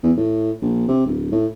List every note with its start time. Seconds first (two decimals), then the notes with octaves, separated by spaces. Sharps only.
0.03 E2
0.17 A2
0.62 A#1
0.88 C3
1.06 D1
1.32 A2